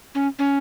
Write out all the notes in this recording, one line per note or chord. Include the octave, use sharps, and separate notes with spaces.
C#4
C#4